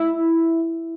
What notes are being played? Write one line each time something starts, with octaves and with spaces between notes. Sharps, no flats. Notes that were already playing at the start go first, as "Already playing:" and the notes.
Already playing: E4